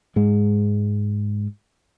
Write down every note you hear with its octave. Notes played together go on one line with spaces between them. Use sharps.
G#2 G#3